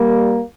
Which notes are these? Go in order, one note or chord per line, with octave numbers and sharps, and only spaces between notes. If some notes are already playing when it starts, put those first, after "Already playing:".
Already playing: G3 A#3